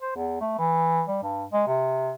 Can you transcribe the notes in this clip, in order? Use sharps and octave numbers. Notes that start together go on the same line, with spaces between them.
C5
E2
A3
E3
G3
G2
G#3
C3